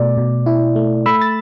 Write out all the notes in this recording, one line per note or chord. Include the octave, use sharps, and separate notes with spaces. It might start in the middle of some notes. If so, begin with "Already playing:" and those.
Already playing: B2 A3 D5
B2
E4
A3
A3 B5 E6
A6